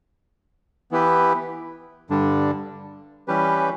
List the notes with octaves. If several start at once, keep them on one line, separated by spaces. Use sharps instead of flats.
E3 B3 E4 G4 B4
G2 D3 G3 D4
E3 G3 C#4 G4 B4